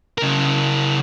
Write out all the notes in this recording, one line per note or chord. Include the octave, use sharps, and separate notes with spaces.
C#3 A#4